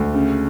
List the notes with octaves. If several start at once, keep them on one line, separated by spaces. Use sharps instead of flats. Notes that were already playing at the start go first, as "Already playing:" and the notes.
Already playing: D2 A3
C#3